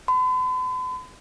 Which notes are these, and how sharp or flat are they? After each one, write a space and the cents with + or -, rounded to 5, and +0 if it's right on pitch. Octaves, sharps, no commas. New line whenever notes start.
B5 +45